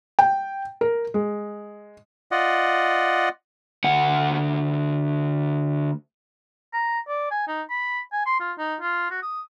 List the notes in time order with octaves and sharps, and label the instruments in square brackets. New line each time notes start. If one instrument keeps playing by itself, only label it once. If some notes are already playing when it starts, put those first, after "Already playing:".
[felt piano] G5
A#4
G#3
[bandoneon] F4 D5 D#5 F#5
[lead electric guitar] D2 F#5
[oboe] A#5
D5
G#5
D#4
B5
G#5
C6
F4
D#4
F4
F#4
D#6